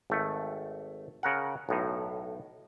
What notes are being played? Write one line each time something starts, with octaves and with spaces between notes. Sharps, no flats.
G#1 A3
C#3 A#4 F#5
B1 A2 D#4